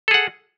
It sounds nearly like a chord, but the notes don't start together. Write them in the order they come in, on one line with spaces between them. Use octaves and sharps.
A4 G#4 F#5